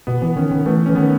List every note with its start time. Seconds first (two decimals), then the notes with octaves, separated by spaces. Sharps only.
0.07 B2 B3
0.22 E3 B3
0.36 D#3 C#4
0.51 D#3
0.66 E3 A3
0.86 E3 C#4
0.95 D#3 B3